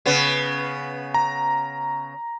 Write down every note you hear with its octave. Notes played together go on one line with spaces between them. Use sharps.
C#3 B3
A#5